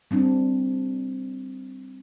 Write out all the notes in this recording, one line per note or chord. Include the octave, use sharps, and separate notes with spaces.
G3 C4 D4